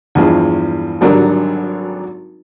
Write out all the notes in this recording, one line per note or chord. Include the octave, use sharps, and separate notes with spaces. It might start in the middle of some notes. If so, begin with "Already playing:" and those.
E2 G2 F3 G#3
G#1 D3 F#3 G3 D4 A#4